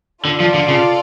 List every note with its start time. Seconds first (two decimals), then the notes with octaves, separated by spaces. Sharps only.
0.25 D3 F4 A4 D5 F5
0.40 F3
0.54 D3
0.68 C#3